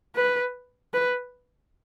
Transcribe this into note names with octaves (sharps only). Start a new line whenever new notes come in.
B4
B4